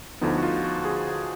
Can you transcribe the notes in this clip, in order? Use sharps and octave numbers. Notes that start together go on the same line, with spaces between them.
D2 D3 F3 B3 D#4
F#4
F4
F#4
G#4